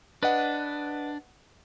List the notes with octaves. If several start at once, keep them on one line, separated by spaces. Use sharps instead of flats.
D4 B4 D#5 F#5